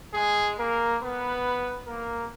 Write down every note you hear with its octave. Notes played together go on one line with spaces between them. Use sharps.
G#3 G#4
A#3 A#4
B3 B4
A#3 A#4